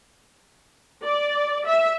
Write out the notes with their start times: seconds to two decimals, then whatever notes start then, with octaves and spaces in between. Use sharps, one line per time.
1.04 D5
1.66 E5